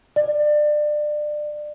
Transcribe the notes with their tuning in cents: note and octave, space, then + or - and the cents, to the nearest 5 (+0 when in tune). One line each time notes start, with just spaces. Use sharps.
D5 +25